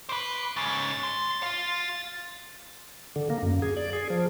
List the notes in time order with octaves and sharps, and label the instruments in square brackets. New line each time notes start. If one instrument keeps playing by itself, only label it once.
[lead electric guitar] B4 C5 [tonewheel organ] C6 D6
[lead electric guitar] G#2 C#3 [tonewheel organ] A6
[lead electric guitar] C6
F4 F5
[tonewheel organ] D3
A#3
F#2
G#4
D5
G#4
F3